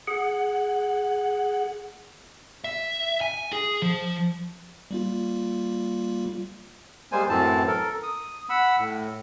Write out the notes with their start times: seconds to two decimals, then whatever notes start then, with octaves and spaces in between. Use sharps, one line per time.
0.07 G#4 F#5
2.64 E5
3.21 G#5
3.53 G#4
3.82 F3
4.91 G3 A#3 F4
7.12 G3 G#3 A#3 C5 G#5
7.29 F#2 A2 E3 C4 A5
7.67 A4 A#4
8.03 D#6
8.49 F#5 B5 E6
8.79 A2